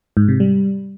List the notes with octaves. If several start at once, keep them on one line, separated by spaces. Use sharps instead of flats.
G#2
C3
G3